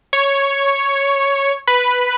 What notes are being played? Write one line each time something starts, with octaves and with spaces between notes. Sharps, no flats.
C#5
B4